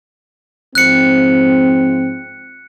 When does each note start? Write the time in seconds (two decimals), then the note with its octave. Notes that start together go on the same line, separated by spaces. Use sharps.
0.75 G#2 F3 C4 F#6 C#7